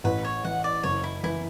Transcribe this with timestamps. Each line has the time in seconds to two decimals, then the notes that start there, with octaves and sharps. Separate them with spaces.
0.04 A1 B4
0.25 C#5
0.44 E3 F#5
0.64 D5
0.83 F#1 C#5
1.04 E4
1.23 E3 E4